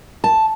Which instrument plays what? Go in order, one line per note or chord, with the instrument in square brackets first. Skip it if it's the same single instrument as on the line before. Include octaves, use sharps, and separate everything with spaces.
[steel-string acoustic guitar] A5